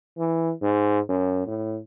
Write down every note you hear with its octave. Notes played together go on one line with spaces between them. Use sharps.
E3
G#2
F#2
A2